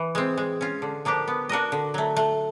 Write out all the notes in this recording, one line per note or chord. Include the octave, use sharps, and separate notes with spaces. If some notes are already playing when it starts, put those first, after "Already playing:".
Already playing: E3
G#3 C4
G#3
C#4 F4
D3
F3 A#3 D4 G4
B3
D4 F#4 A#4 D#5
D3
F#3 A3
A3